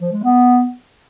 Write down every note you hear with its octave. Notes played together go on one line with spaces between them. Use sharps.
F3
G#3
B3